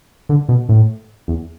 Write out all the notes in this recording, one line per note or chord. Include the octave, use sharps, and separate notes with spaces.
D3
B2
A2
E2